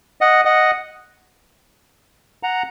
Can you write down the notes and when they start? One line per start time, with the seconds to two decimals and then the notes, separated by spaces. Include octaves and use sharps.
0.21 D#5 F#5
0.45 D#5 F#5
2.43 F#5 A#5